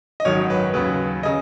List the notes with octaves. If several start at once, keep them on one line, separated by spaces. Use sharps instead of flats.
D#5
G#1 F#2 D#3 F#3 C#5
B4
D#2 C#3 F#3 B4
C#3 D#5